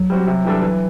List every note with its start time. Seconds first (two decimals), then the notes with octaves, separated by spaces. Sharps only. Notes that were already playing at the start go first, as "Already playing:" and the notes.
Already playing: F#3
0.10 G3 C4 F#4
0.27 C3
0.45 E3 G3 D4 A4
0.62 E3